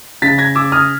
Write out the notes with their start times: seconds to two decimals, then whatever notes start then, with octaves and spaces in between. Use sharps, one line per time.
0.22 C#3 A6 B6
0.38 G#6 A#6
0.55 C#3 D6 E6
0.72 D#6 F6